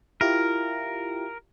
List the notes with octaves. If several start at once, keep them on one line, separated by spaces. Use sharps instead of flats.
E4 F4 G4 A#4